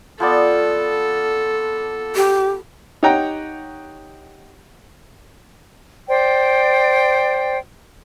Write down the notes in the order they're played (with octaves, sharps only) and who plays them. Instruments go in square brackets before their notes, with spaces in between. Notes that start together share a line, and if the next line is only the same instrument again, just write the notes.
[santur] F3 B3 D5 [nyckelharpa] A4
[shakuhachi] G4
[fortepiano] D#4 G4 C#5 F#5 G5 A#5
[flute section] C5 D5 G5